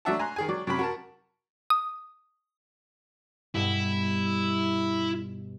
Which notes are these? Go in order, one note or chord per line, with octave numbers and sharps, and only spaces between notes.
F#3 A3 D4 E5 F#5 A5
G#5 A#5 C6 F#6
D#3 G#4 G#5
F#3 D5
F#2 C3 F#3 B5
F#4 A#4 A5
D#6
G2 B2 E4